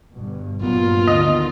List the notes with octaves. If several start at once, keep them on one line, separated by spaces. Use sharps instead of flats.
G1 G2 B2
G2 A#2 F#3 A#3 B3 F4
D2 D3 D#3 D#5